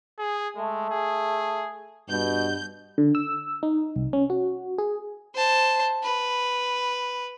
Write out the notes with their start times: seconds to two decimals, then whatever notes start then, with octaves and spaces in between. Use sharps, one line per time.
0.19 G#4
0.57 G#3 A3
0.90 G#4
2.09 G2 B2 G6
2.98 D3
3.15 E6
3.63 D#4
3.96 C2
4.13 C#4
4.30 F#4
4.78 G#4
5.35 C5 A5
6.03 B4